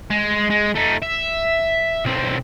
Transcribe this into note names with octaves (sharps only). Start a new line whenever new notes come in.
G#3
G#3
A3 D#4
E5
B1 C4